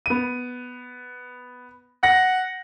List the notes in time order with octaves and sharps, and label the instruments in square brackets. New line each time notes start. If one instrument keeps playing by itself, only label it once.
[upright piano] B3 D#7
[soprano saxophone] F#5 [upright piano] A#6